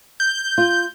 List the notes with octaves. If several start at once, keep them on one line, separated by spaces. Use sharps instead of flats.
G6
F4